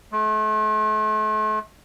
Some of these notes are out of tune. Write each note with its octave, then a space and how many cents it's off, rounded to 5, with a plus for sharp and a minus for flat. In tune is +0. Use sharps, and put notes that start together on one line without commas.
A3 -40